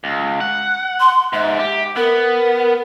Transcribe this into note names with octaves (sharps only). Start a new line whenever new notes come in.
C#2
F#5
C6
G#2 E5
G4
B3 A#4